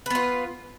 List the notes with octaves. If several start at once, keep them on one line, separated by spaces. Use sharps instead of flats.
B3 F4 B4